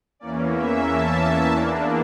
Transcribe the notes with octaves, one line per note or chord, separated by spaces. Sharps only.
E2 E3 A#3 C#4 D5
E5
A5
E2 E3 A#3 D4